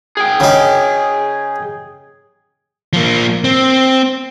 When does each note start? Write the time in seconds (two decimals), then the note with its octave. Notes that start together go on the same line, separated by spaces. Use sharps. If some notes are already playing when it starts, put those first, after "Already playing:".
0.17 G#4 G5
0.40 C#3 D#4
2.93 F3 A#3
3.44 C4